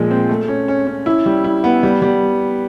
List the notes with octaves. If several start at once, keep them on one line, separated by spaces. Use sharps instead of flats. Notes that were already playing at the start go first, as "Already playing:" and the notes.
Already playing: A#2 F3 G#3
C4
A3
C#4
C#4
C#4
E4
G3
E4
B3
G3
G3